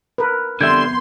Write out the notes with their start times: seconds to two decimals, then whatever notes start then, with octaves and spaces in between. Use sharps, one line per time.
0.18 A#4 B4
0.61 F2 D3 G3 B3 E5 C6 G6 G#6